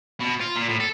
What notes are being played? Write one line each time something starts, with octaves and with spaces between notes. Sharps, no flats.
B2
F4
A#2
A2
A4